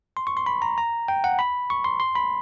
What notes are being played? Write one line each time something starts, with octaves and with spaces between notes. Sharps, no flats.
C6
C#6
C6
B5
A#5
A#5
G5
F#5
B5
C#6
C6
C6
B5